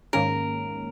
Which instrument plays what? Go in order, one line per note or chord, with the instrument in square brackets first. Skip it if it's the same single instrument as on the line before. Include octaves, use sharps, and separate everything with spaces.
[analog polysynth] G#2 D#3 A#3 C#4 [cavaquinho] A#4